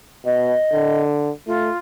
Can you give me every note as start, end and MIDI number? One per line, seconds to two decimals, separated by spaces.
0.25 0.54 47
0.25 1.01 75
0.73 1.31 50
1.47 1.70 57
1.47 1.77 65